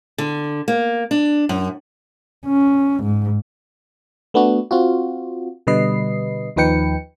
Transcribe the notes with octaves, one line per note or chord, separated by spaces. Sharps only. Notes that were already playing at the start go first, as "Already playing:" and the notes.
D3
A#3
D4
F#2
C#4
G#2
A3 B3 D4 F#4
C4 F4 F#4
B2 D3 G3 B4 D#5 C7
D#2 F3 D#4 B4 G5 C#7